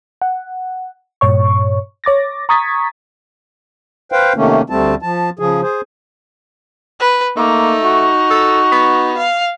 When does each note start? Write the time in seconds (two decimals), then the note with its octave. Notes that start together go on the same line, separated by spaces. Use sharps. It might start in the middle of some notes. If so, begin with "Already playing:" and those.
0.22 F#5
1.21 G2 A#2 C#5 C#6
2.04 C#5 D6 A6 A#6
2.49 A#5 C#6 D#6 G#6 A6 B6
4.12 B4 C5 F5 G5
4.36 C3 D#3 A3 A#3 C#4
4.70 D2 G3 A3 C4 A5
5.02 F3 A5
5.39 C#3 F3 G#4
5.62 G#4 C5
7.00 B4
7.37 A3 A#3 D#4
7.84 F#4
8.31 A4
8.72 B3
9.17 F5